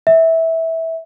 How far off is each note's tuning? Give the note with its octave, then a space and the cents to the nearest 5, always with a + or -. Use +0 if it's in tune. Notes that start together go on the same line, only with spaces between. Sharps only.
E5 -15